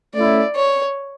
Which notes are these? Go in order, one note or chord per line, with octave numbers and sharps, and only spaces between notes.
A3 C#4 E4 D5
C#5